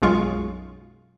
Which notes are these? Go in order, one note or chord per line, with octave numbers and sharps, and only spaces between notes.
B1 F#2 G#3 F4 C#6